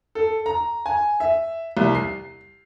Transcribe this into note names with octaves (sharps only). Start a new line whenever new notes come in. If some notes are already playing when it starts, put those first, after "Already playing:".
A4
A#5
G#5
E5
C2
C7